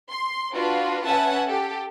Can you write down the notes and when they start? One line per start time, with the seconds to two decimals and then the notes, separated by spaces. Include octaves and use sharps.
0.10 C6
0.54 D4 F4 F#4 B4
1.05 C#4 B4 E5 F#5 G#5 A5
1.47 G4 A4